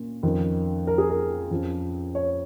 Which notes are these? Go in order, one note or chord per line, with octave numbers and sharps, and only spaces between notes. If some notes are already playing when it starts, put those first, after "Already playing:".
Already playing: A#2 C#4
F2 D#3 C#4
A#4
G#4
A#4
F2 F3 C#4
C#5